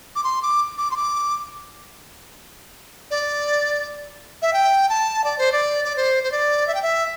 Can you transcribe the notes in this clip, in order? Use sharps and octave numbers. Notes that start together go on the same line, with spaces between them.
D6
C6
D6
D6
C6
D6
D5
E5
G5
A5
D5
C5
D5
D5
C5
C5
D5
E5
G5
E5